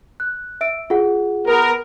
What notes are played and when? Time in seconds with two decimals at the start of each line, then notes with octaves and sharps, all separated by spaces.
0.20 F#6
0.61 E5 E6 D7
0.90 F4 G#4 F#5
1.47 B3 A#4